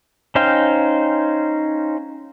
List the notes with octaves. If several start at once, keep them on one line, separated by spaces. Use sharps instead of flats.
C#4 D#4 C5 F5 G5